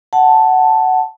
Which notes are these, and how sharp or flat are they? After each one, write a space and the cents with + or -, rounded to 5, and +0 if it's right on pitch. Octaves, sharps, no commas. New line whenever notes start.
F#5 +10 A5 +0